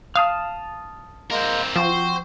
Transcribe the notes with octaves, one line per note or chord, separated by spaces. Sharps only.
F5 A5 D#6 F6
G#3 A#3 C4 A#4
F3 C4 F#4 C5